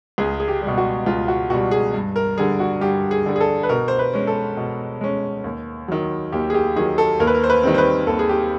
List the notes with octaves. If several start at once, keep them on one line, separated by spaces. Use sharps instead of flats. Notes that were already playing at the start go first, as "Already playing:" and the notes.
C#2 G#4
G#4
G4
B2 G3
F#4
C#2 F4
F#4
B2 G3 F#4
G#4
G2
A#4
D3 G3 G#4
F#4
G2 G4
G#4
D3 G3
G#4
A4
B4
B2 A#4
C5
B4
G#3 C#4
A4
B2
G#3 C#4
D#2
D#3 F#3
D#2 G4
G#4
G4
D#3 F#3 G#4
A4
D#2 A#4
B4
A#4
C5
B4
D#3 G3 C4
C5
B4
D#2 A4
G#4
G4